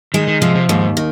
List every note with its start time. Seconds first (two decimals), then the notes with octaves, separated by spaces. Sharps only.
0.14 D#3 G#3
0.28 D#3
0.41 C3 F3
0.55 C3
0.69 D#2 G#2
0.97 D#3